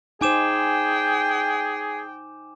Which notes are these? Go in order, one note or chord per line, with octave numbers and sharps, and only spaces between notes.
D#4 G#4 C5 G5 G#5 D6 E7